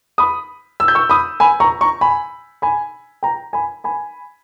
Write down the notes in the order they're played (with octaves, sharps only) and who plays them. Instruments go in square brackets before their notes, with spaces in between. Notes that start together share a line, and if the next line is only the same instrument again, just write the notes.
[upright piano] B5 D#6
E6
G6
C#6 E6
B5 D#6
G#5 B5
A#5 C#6
A#5 C#6
G#5 B5
G#5 B5
G5 A#5
G#5 B5
G#5 B5